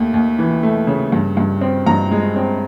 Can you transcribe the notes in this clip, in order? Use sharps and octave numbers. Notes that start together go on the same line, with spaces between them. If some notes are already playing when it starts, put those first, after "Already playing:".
Already playing: D#2 A3
D#2
E3
A3
C#3
G2
G2
C4
G2 A#5
G#3
C4